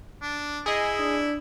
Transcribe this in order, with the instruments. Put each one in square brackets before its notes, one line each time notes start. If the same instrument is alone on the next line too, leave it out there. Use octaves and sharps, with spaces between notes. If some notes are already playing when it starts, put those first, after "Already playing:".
[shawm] D4
[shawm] E4 [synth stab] G#4 D#5
[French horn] D4